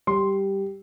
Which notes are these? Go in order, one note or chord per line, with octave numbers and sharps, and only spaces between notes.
G3 C6